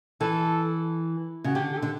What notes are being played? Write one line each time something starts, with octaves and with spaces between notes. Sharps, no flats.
E3 A4
C#3 F#4
D3 G4
G4
A4
D3